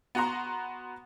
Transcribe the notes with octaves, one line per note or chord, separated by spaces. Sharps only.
B3 F#4 F#5 A#5 C6